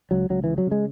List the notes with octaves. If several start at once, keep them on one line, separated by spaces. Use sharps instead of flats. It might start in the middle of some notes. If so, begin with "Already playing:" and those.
C#2 F#3
C#2 F#3
C#3 E3
F#3
C#3 G#3